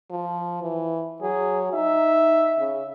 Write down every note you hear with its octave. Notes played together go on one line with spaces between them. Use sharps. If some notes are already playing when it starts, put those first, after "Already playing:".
F3
E3
F#3 G#4
D#4 E5
C#3